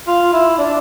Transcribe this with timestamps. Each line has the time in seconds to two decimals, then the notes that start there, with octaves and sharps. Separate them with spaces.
0.07 F4
0.33 E4
0.58 D4